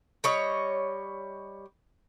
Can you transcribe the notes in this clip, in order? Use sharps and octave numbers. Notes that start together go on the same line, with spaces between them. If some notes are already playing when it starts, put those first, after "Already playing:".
G3 C#5 D#5